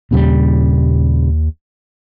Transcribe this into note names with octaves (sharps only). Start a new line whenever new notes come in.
D#2 A#2 C#3 G3